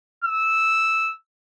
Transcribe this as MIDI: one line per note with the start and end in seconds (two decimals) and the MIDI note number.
0.25 1.14 88